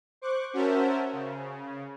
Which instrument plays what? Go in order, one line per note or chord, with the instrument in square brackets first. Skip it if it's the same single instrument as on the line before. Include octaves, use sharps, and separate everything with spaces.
[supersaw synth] C5 C#6 D6 F#6
C#4 F#4 A#4 C5 E5 A5
C#3